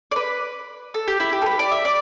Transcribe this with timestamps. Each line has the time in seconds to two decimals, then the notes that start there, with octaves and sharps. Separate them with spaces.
0.11 D5
0.16 B4
0.94 A4
1.08 G4
1.20 E4
1.33 G4
1.42 A4
1.46 B4
1.59 D5
1.71 E5
1.85 D5